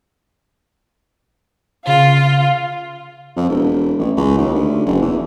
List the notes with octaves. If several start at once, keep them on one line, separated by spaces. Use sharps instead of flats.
C#3 F4 F5
F2
E1
A1
C#2
D#2
D2
F#1
E2